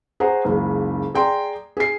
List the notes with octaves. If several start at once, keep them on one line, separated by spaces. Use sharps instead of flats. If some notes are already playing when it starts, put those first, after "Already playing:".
G#4 C5 C#5 F#5 A#5
F#1 C#2 C#3
G#4 D5 G5 A#5 C6
G#4 C7